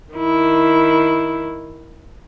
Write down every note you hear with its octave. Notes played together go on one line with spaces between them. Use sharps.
D#3 E4